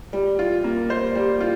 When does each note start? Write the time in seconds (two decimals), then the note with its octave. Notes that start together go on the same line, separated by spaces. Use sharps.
0.13 G3
0.39 F4
0.64 A#3
0.90 C5
1.15 G3
1.41 F4